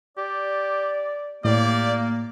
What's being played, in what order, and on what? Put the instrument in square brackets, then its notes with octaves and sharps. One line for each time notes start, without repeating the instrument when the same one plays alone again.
[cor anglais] G4 [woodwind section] D5
[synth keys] A2 [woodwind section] A#3 [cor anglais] G4 [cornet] D5